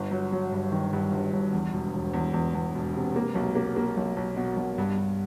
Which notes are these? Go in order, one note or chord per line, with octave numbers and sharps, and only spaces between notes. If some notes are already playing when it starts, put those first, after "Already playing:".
Already playing: G1
F#3
F#3
G2
D#3
G2
G1
G1
E2
E1
E1
E2
E2
E2
E1
C3
A#3
B1
A#3
A#3
B1
B1
B2
B1
G2
G2